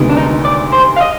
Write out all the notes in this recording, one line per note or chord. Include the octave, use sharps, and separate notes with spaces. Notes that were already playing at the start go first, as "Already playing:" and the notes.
Already playing: D2 C3 D#3 G#3 B3
D4
D#4
D5
C5
F5
D#5